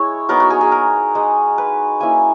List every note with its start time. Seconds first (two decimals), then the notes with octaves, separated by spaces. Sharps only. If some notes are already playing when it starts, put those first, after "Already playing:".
Already playing: G#3 E4 C#5
0.29 F#3 B3 D#4 A#4
0.40 F#4
0.50 G#4
0.61 G#4
0.72 A#4
1.15 G#3 D#4
1.58 B4
2.00 A#3 C#4 E4 G#5